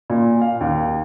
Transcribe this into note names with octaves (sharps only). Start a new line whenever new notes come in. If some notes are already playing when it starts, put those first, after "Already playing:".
A#2
F5
D#2